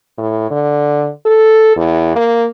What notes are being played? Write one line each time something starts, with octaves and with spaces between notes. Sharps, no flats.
A2
D3
A4
E2
A#3